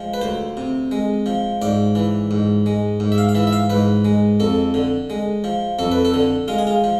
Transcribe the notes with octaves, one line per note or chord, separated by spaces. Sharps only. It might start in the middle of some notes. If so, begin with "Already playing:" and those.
Already playing: F3 G#3
B4
D2 C5
C3
G#3
F3
G#2 D5
E3
G#2
G#3
G#2
E5
F5
F5
E3 E5
E5
F5
G#2 B4
G#3
F2 A4
D3
G#3
F3
F2 A4
B4
A4
D3
G#3 F4
G#4
F4
F3